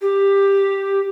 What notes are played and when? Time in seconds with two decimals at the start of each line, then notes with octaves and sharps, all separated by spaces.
0.02 G4